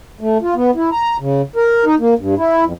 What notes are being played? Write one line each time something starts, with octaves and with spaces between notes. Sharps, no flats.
A3
F4
B3
E4
A#5
C#3
A#4
D#4
A#3
G2
E4
F2